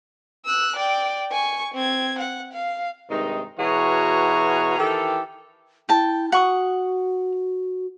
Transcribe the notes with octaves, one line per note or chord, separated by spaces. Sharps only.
E6 F#6
D5 G5
G#5 C#6
C4 G#6
F#5
F5
G2 C3 D#3 G#3 D#4
B2 E3 F#4 G#4 C#5 A#5
D#3 E3 G4 A4
E4 G5 A5
F#4 F#5 C#6 D#6